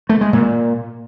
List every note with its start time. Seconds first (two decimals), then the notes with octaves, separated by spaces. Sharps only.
0.09 A3
0.21 G#3
0.33 A#2